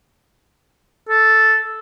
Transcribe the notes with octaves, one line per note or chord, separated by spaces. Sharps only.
A4